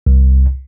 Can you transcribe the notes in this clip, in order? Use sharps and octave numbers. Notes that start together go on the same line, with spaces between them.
C2